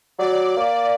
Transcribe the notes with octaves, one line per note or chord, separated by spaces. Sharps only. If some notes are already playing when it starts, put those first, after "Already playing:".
F#3 D5
A#3